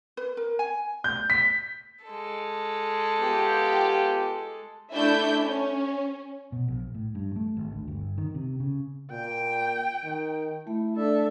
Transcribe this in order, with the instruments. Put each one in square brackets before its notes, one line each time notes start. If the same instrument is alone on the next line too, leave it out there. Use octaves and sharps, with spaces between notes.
[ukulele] B4
A#4
G#5
[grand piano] G6
B6
[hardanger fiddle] G#3 A4
[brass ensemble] B3 F4 G4
[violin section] A3 D4 E4 E5 G6
C#4
[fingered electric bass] B2
A#1
A2
G2
A3
G#1
D2
G1
D#3
C3
C#3
[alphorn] A#2 [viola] G5
[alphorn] D#3
[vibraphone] A3 [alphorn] E4
[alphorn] D4 [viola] A4 E5